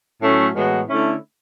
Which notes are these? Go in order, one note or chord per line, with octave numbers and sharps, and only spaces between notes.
A2 F#3 A3 C#4
A2 E3 G#3 B3 F#4
D3 A3 C#4 E4